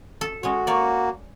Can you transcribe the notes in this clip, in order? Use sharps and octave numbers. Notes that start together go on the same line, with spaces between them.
A4
G#3 C#4 F#4 C#5
A#3 C#5 D5